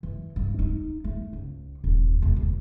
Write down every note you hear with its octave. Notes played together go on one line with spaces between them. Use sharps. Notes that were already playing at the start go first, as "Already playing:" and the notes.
E3
G2
D#4
A3
C#2
D#1
E1
D2